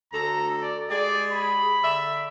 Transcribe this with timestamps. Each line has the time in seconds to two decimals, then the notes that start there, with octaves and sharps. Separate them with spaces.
0.13 D2 A4 A#5
0.61 D5
0.90 G#3 G4 G#4 D5
1.30 B5
1.83 D3 D5 E5